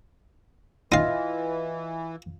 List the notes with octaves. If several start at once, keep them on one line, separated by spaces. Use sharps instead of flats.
E3 D#4 F4 D#5 F5 A#6